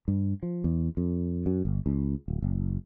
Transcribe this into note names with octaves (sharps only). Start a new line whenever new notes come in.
G2
F3
E2
F2
F#2
G1
C#2
D1
F#1